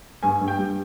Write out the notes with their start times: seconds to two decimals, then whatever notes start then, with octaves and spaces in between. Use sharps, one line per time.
0.23 G2 G#5
0.41 G2
0.48 G5
0.59 G3